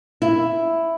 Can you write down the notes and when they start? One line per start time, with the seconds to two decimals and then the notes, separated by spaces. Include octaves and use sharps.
0.22 E4